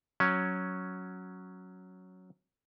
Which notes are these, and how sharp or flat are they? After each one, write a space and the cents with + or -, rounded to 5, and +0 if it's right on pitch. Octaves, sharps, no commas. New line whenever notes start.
F#3 +0 C#4 +0